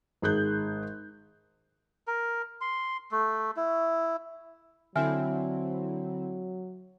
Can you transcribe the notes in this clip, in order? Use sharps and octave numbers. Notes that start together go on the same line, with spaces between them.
G#1 G#4 F#6 G6
A#4
C6
A3
E4
D3 F#3 C4 E4 E5 G#5 F6